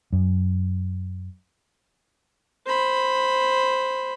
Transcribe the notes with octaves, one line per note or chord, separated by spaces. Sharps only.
F#2
C5 B5